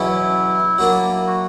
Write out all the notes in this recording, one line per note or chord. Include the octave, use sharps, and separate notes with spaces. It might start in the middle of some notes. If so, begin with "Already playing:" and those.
Already playing: E2 B2 F#3 C#4 E4
F#3 A#3 D4
F#4